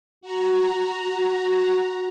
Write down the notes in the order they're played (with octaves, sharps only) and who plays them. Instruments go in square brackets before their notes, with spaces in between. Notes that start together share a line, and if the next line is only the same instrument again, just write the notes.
[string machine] F#4 A#5